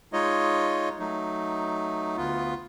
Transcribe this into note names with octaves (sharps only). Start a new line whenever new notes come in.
G#3 D#4 F4 C#5 D#5
F#3 A3 D#4
D2 B3 F4